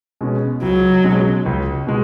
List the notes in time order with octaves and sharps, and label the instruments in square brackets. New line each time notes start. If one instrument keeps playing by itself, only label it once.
[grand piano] B2 G#3 C#4
[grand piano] C#2 [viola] F#3
[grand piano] B2 G#3 C#4
C#2
B2 G#3